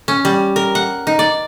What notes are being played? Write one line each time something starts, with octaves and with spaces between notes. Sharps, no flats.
C#4
G3
A#4
F#5
D#4
D5